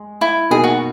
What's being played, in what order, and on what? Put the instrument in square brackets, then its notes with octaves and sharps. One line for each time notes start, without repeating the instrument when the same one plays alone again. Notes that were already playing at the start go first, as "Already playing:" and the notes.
Already playing: [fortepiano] G#3
[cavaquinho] E4
[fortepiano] B2 A#3 D#4 [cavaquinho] G#4
[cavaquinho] F#4